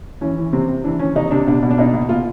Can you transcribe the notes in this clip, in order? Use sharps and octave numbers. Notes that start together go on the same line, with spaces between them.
E3 C#4
E3
C3 C4
C3
E3 D4
E3 C#4
C3 D#4
C3 D4
B2 D4
B2
D4
B2 D#4
B2
B2 F4